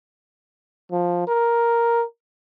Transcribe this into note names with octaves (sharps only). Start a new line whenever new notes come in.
F3
A#4